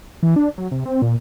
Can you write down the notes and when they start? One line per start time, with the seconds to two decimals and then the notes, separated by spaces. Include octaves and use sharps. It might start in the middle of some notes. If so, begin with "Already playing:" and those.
0.23 E3
0.36 D4
0.58 F#3
0.71 C3
0.85 C4
1.02 A#2